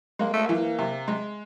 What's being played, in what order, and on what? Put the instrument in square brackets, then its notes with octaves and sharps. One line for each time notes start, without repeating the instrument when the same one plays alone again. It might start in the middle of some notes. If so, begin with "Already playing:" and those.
[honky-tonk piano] G#3 [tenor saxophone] A#3
[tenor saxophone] A3
[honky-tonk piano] E3 [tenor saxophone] A#3
[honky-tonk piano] C3
G#3